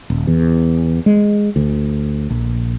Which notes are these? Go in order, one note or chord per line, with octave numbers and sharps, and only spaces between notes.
D#1
E2
G#3
D2
A#1